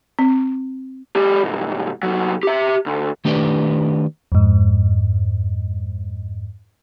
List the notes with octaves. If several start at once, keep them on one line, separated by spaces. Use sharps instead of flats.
C4
G#3 G4
C2 G#2
C2 F#3
G4 E5
D2
D#3 A3 D4 G4 B4 D5
F2 G#2